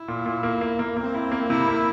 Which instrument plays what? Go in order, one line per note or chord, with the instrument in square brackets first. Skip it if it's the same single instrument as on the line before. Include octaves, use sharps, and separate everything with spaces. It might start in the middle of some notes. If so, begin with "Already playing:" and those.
Already playing: [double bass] E4
[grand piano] A#2
A#2
A#3
A#3
A#3
[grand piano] A#3 [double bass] C4
[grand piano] E4
A#3
[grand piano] C3 [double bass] E4
[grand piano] A#3